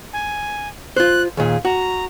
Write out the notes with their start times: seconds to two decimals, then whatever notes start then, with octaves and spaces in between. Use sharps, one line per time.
0.13 G#5
0.97 F4 C5 F#6
1.37 D#2 A#2 G#4
1.65 F#4 A#5